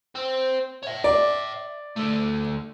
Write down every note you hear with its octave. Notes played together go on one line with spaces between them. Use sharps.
C4
C#5 E5
D5
D3 A3